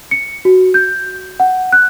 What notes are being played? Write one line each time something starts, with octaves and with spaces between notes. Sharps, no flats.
C#7
F#4
G6
F#5
F#6